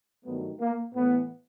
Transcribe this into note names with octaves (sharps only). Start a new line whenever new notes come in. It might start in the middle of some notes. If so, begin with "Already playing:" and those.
G2 D#3 F#3 A3 B3
A#3
A2 E3 A3 B3